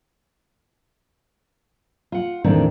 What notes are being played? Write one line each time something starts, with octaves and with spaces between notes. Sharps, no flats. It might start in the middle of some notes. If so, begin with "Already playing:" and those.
F4 F#5
E2 A2 D#3 C4 D4